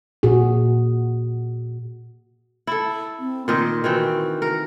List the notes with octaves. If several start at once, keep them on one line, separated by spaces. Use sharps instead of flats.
A#2 F#4 G#4
E4 A4
C4
A#2 D#3 D#5 C6
D#3 E3 C4 F#4
A#4